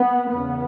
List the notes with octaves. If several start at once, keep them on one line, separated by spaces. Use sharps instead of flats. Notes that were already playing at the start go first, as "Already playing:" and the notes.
Already playing: B3
E2 C#3 B3